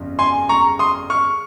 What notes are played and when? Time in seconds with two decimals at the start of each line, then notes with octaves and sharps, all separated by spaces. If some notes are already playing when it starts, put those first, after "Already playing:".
Already playing: G1 F2 C#3
0.19 G#5 C6
0.49 A#5 C#6
0.79 C6 D#6
1.10 C#6 F6